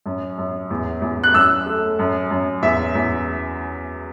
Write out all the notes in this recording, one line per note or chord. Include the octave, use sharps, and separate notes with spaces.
F#2
F#2
E2
E2
F#6
F#2 E6
A3
F#2
F#2
E2 E5
E2